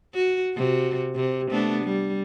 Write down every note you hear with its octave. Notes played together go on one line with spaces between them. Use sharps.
F#4
C3 F#4
C3
A3 B3 D4
G3